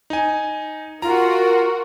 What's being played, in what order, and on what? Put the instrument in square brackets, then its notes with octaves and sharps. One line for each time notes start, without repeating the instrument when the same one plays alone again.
[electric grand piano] D#4 G#5
[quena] F4 [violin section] F#4 A#4 [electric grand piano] A#5